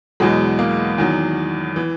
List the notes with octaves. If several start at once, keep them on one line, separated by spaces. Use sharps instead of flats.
E2 B2 F#3 G#3
A#3
E2 D#3 F#3
E3